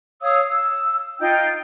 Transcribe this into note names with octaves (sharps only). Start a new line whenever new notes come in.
C#5 F5 D#6 E6
E6
D#4 F4 G5 G6